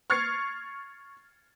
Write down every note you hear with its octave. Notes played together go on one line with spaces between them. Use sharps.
C#6 F6 G#6 A6 C7 C#7